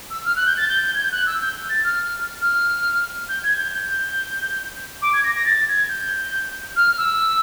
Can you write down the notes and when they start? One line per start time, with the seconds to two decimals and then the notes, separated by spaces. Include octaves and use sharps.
0.10 E6
0.25 F6
0.36 F#6
0.47 G6
0.57 A6
0.68 G6
0.94 G#6
1.03 G6
1.12 F#6
1.27 E6
1.41 G6
1.70 A6
1.84 F6
2.42 F6
3.29 G6
3.43 G#6
3.58 G6
3.72 G6
5.02 D6
5.14 G#6
5.24 A#6
5.35 A#6
5.45 A6
5.68 G#6
5.89 G6
6.76 F6
6.98 E6